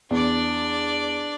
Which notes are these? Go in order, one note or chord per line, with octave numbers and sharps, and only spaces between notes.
E2 D4 D5